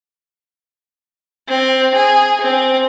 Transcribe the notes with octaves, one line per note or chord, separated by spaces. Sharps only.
C4
G#4
C4